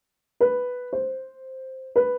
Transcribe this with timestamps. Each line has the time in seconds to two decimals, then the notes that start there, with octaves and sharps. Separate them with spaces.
0.41 B4
0.93 C5
1.96 B4